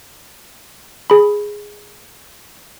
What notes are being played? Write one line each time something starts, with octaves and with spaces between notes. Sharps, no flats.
G#4 B5